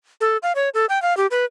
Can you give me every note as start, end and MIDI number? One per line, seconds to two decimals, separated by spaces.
0.21 0.37 69
0.43 0.53 77
0.55 0.69 73
0.74 0.86 69
0.89 1.01 79
1.02 1.16 77
1.17 1.27 67
1.31 1.45 71